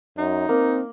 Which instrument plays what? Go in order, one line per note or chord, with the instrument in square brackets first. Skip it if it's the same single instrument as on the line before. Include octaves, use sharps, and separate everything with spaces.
[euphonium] F#2 [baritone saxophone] D#4
[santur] A#3 [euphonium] C4